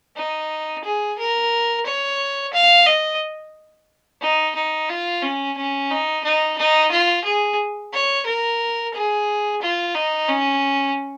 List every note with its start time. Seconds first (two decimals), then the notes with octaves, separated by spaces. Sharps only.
0.16 D#4
0.84 G#4
1.18 A#4
1.86 C#5
2.53 F5
2.86 D#5
4.21 D#4
4.55 D#4
4.89 F4
5.23 C#4
5.57 C#4
5.91 D#4
6.24 D#4
6.57 D#4
6.91 F4
7.25 G#4
7.93 C#5
8.26 A#4
8.94 G#4
9.61 F4
9.95 D#4
10.29 C#4